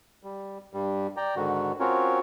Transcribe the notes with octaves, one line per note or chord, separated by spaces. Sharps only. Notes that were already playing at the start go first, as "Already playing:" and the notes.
G3
G2 G3
D5 G5 A#5
G#2 D3 D#3 F#4
C4 C#4 F4 F#4 A#4 C#5